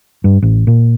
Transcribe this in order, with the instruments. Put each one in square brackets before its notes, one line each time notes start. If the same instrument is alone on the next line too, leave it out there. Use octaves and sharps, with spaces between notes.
[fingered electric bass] G2
A1
A#2